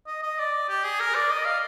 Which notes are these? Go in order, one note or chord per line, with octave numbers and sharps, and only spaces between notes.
D#5
D#5
D5
G4
G#4
A#4
D5
D#5
F5